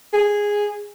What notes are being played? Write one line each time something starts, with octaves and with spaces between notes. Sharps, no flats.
G#4